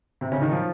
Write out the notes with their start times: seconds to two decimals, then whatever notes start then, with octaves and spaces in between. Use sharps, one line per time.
0.21 C3 C4
0.32 C#3 C#4
0.42 D#3 D#4
0.52 F3 F4